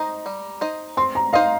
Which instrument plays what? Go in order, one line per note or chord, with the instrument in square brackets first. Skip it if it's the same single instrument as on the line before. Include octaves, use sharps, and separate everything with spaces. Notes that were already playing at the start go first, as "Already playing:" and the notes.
Already playing: [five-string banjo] D#4 C5 D#5 [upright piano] A#5
[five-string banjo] G3
D#4 C5 D#5
[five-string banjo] C4 [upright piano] C6
[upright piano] A#5
[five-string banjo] D#4 C5 D#5 [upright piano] F5